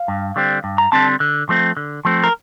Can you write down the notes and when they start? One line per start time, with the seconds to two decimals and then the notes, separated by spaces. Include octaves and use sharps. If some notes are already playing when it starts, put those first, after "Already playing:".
Already playing: F5
0.08 G2
0.36 D3 G3 C4
0.64 G2
0.78 A#5
0.92 D3 G3 C4 A5
1.20 D3
1.49 F3 A3 C4
1.77 D3
2.05 F3 A3 C4
2.24 A#4